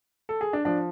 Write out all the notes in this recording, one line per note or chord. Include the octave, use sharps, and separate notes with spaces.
A4
G#4
D4
F3 D4